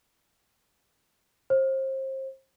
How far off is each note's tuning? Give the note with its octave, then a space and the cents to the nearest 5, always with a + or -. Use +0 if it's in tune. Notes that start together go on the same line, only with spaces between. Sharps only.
C5 +30